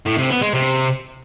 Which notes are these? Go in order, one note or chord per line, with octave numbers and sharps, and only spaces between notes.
A2
C3
B3
G#3
C3